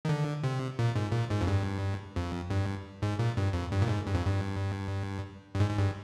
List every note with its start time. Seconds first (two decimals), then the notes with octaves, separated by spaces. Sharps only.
0.05 D#3
0.09 D3
0.44 C3
0.79 A#2
0.96 G#2
1.12 A#2
1.30 G#2
1.41 F2
1.47 G2
2.16 F2
2.50 G2
3.02 G#2
3.19 A#2
3.37 G2
3.53 F2
3.72 G2
3.82 A#2
3.88 G#2
4.06 G2
4.14 F2
4.25 G2
5.55 G2
5.60 G#2
5.71 G#2
5.78 G2